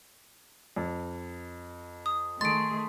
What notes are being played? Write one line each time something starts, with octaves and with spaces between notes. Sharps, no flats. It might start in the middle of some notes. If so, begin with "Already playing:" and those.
F2
D#6
D#3 A3 G#4 C6 A6 D7